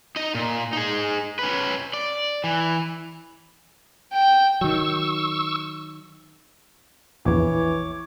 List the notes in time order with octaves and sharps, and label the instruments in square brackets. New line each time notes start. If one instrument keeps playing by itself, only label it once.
[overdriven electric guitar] D#4 D#5
A#2
D#4 G#4
C#4 B4
D5
E3
[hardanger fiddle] G5
[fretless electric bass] D#3 F#3 [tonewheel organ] C#6 E6
[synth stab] A#1 E2 [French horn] E3 [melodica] C#5 D6